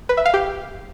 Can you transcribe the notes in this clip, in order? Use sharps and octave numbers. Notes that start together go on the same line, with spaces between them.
B4
E5
F5
G4